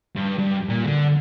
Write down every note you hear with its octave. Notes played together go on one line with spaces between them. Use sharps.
G2
G2
A#2
D3